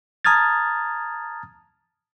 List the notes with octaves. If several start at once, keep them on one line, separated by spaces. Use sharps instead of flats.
A5 A#5 D#6 F6 G#6 A6